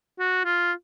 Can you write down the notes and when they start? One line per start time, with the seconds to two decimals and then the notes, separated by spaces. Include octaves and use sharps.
0.19 F#4
0.45 F4